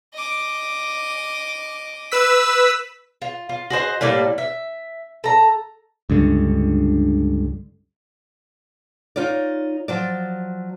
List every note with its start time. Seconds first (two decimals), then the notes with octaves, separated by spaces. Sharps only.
0.14 D#5 D6
2.12 B4 E6 B6
3.22 F4
3.49 F4
3.70 F#4 G#4 C5 D#5
4.01 A2 G3 A#3 D5
4.38 E5
5.24 A4 A#5
6.10 C#2 G2 D3
9.16 D#4 F4 C#5 D5
9.88 F3 F#3 D5